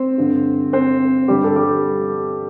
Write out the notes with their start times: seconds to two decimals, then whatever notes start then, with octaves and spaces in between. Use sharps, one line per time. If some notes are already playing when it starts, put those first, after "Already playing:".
Already playing: C4 C5
0.18 G2 D3
0.73 C4 C5
1.28 G2 D3 G3 G4
1.44 A4
1.56 G3 G4